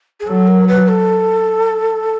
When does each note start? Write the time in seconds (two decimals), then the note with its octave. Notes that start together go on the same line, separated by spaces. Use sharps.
0.20 G#4
0.27 F#3 A4
0.47 A#4
0.68 B4
0.88 A4